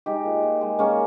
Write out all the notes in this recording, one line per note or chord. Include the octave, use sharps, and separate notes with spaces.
G#3 D#4 G4
A#2
A#2
G#3
G#3 A#3 C#4